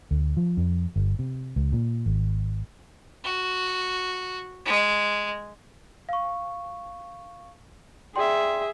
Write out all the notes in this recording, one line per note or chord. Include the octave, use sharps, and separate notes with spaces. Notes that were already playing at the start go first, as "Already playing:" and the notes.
D2
F3
F2
G1
C3
C#2
A#2
G#1
F#4
G#3
F5 C#6
G#4 D5 E5 G5 C6